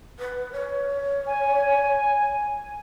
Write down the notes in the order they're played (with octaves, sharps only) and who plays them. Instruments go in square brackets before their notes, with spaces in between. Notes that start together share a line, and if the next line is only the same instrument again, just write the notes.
[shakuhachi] B4
C#5
[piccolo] G#5